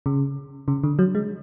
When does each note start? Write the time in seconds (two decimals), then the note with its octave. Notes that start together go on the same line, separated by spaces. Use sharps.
0.06 C#3
0.68 C#3
0.84 D3
0.99 F#3
1.15 G#3